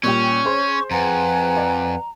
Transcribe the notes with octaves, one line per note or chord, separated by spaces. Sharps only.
A#2 G3 C#4 G5 C#6
G#4 C5 C#5 C6
F2 B4 F#5 G#5 A#5
D5